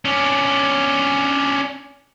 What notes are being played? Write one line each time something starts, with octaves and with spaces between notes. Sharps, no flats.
C#4 D4